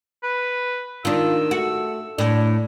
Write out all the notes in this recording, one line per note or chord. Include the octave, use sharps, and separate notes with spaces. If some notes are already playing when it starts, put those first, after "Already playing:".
B4
D#3 D4 F4 E6
A3 F#4
A2 D4